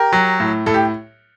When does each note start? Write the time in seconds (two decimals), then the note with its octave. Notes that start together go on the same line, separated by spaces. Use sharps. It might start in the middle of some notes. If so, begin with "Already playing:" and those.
Already playing: G4 A#4
0.13 F#3
0.40 A2
0.66 A2 A4
0.74 G4